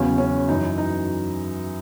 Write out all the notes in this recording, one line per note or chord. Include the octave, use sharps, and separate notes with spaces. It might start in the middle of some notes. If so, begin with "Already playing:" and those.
Already playing: E2 C#3 F#3 C#4
C#4
F#2 E3 D#4
D#4